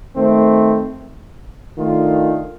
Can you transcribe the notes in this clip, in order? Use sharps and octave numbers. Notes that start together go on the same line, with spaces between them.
D#3 A3 C4
D#3 A3 D4 F4